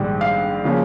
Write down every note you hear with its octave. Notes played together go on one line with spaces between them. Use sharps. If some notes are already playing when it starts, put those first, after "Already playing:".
Already playing: A#1 G#2 D#3 G3
F5
C#3 F3 A#3 C#4